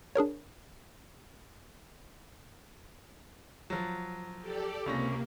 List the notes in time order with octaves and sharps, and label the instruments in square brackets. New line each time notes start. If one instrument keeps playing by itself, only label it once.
[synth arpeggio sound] D4 G#4 A#4 C#5
[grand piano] F3 F#3
[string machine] G4 A4 D5
[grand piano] C#2 C#4 A#6 [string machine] C3 A#3